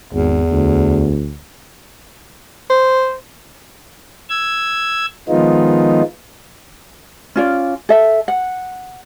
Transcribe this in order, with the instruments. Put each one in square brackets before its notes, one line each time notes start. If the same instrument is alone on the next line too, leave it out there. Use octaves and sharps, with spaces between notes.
[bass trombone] G#1 [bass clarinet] E2
[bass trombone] D2
[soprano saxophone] C5
[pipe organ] E6 G#6
D#3 F3 G#3 B3 D#4 F4
[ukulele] C#4 F4 D5
A4 E5
F#5